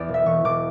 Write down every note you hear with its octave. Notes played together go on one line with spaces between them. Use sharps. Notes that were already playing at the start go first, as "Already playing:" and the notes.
Already playing: E2 D5
E1
E5
E1 C#6
E1 D6